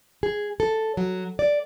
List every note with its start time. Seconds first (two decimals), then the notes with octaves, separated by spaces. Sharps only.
0.23 G#4
0.60 A4
0.97 F#3
1.39 D5